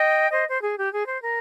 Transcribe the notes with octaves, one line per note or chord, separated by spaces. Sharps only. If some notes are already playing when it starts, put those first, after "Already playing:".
Already playing: D#5 G5
C5 D#5
C5
G#4
G4
G#4
C5
A#4